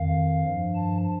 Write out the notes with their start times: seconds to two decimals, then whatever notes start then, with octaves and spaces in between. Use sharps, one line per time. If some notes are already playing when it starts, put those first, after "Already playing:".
Already playing: F2 D#3 F5
0.43 G2 F3
0.75 A5